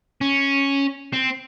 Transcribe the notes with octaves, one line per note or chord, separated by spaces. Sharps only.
C#4
C4